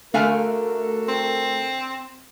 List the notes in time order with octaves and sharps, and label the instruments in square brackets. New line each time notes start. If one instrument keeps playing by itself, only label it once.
[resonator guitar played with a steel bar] D3 F5 G#5 [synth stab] A3 [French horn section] F#4 A4 A#4
[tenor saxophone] C4